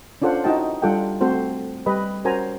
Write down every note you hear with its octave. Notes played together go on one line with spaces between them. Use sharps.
C#4 D4 F4 A4 C5 F#5
D#4 E4 F#4 D#5 G5 A5
G3 D4 F4 A4 F#5 G5
A3 C4 F#4 A4 C5
G3 G4 B4 D#5 B5
C#4 F#4 A#4 C5 G#5 A#5